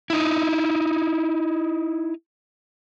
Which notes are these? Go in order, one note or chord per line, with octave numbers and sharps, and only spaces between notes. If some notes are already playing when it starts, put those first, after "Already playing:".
D#4 E4